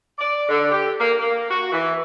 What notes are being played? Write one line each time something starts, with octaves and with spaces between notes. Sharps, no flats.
D5
D3
G4
A#3
A#3
F#4
E3